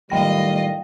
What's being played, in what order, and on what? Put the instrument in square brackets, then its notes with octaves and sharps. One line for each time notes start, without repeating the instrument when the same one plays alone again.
[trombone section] A2 D#3 G3 [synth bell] F#3 G5 A#6 [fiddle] F4 D#5